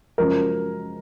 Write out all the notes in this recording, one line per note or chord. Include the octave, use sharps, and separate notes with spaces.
F#2 C#3 F3 G#3 A#4